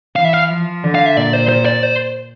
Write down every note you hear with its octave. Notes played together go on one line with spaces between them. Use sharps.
E3 F5
E5
F5
F3
D3
F5
E5
A#2 D5
C5
C5
D5
C5